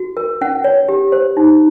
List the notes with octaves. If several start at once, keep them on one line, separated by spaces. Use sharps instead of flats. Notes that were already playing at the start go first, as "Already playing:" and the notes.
Already playing: F#4
A#4
C#4 F#5
C#5
G4
C5
D#4